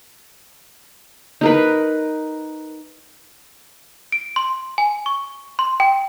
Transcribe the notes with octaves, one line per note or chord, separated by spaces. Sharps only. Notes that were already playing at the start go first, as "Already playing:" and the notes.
D#4 A#4 B4
D7
C6
G#5
C#6
C6
G5